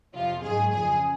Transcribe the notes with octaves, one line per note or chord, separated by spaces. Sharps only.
F2 C3 F3 F4
G#2 D#3 F#3 G#4
F2 C#3 F3 G#4